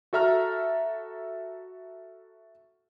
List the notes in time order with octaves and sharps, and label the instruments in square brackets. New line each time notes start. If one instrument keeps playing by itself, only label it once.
[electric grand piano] F#4 A4 E5 A#5 F6